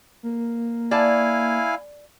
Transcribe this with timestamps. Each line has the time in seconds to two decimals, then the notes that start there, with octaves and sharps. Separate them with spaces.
0.23 A#3
0.91 E4 D5 F5 G#5 A5